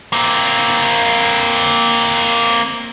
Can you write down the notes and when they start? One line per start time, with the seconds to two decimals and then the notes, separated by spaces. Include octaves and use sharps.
0.13 A#3 C4